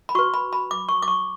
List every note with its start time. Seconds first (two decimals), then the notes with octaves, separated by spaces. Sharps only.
0.09 B5
0.15 F#4 B4 C#6
0.34 B5
0.53 B5
0.71 D6
0.89 C#6
1.02 D6
1.08 C#6